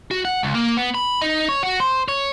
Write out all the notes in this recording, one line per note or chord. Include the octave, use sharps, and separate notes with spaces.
F#4
F#5
C#2
A#3
B3
B5
D#4
C#5
F#4
C5
C#5